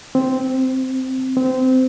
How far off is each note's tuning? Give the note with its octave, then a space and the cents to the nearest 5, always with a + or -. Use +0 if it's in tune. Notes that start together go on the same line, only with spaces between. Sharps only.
C4 -5
C4 -20